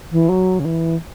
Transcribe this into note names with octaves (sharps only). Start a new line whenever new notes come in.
E3
F#3
C#3
E3